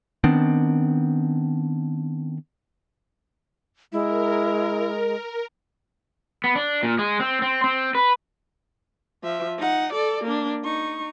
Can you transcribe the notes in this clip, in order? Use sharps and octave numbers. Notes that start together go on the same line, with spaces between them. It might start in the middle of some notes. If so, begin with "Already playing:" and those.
D#3 B3 C4 D4
G#3 E4 A#4
B3
D4
A#2
G#3
C4
C4
C4
B4
F3 E5
D#4 F#5
A4 D5
A#3 D4
D#4 C#6